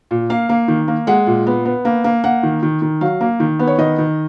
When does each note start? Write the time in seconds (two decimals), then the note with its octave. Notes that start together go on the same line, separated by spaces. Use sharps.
0.11 A#2
0.30 A#3 F5
0.49 A#3
0.68 D#3
0.88 A#3
1.07 G#3 F#5
1.27 A#2
1.47 B3
1.65 B3
1.85 A#3
2.04 A#3
2.24 A#3 F#5
2.43 D#3
2.63 D#3
2.82 D#3
3.01 F#3 F5
3.21 A#3
3.40 D#3
3.59 B3
3.67 C#5
3.78 D#3 D#5
3.98 D#3